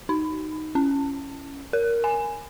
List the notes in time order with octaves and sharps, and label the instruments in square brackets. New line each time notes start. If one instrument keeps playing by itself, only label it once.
[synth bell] D#4
C#4
A#4
G#5